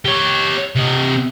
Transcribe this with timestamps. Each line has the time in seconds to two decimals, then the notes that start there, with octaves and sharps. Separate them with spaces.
0.05 G4 C#5
0.76 C3 D#5